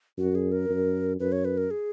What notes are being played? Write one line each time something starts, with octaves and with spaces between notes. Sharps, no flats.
F#2 F#4
G#4
A#4
F#2
F#2 B4
C#5
B4
A#4
G#4